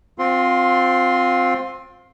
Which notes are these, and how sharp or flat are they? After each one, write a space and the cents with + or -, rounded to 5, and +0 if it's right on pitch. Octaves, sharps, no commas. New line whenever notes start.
C4 +0 F4 +25 C6 +0